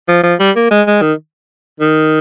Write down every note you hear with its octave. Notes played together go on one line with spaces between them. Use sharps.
F3
F3
G3
A#3
G#3
G#3
D#3
D#3